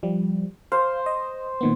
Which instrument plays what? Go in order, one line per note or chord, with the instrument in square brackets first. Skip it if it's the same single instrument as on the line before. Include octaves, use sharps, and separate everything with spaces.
[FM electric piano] F3 G3
[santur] C5 [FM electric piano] F5
[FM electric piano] D#5
A#2 D#3 B3